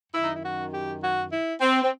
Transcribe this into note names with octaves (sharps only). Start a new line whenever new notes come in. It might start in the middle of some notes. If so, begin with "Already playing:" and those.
F#2 D#3 E4
D#4
E4
F#4
G4
F#4
E4
C4
C4